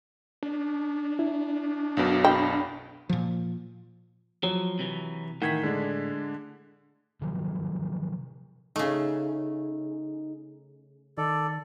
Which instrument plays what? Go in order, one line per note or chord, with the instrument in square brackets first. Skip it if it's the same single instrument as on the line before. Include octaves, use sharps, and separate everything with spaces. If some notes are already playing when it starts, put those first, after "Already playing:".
[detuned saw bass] D4
[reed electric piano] E4
[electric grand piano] B1 F#2 B2
[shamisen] G5 [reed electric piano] B5
[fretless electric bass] A#2 F3
[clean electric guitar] F3 [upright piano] F#3
[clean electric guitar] C3 E3
[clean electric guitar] A2 [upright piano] D#3 E3 [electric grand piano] F#5 G#6 B6
[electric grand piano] D3 D4 [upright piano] G#3
[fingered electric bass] C3 D#3 F3 F#3
[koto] C#3 A3 [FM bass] D#4
[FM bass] D#3 [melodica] A4 D5